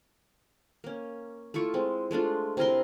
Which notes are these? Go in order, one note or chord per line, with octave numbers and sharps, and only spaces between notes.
A#3 C#4
A3 E4 F4 C#6
G#3 C4
G#3 A3 D4 F4
C3 E4 A#4 C6